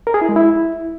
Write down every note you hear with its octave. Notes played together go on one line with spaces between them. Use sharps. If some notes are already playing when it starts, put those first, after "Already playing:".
A#4
G#4
E4
G#3
E4